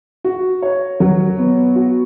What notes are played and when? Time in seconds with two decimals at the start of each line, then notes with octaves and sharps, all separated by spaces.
0.24 F#4
0.62 C#5
1.00 F#3
1.38 B3
1.76 F#4